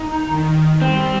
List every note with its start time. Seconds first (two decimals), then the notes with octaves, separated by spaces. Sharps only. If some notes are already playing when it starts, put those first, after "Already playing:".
Already playing: D#4
0.27 D#3
0.82 G3 C4